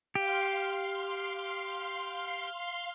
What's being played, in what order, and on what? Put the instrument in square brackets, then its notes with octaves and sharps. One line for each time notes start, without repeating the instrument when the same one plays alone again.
[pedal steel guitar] G4 [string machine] F5 C6